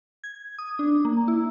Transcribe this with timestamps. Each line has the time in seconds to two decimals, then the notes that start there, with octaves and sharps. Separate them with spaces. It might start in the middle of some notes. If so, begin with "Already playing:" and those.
0.24 G#6
0.58 D#6
0.79 D4
1.05 A#3
1.28 E4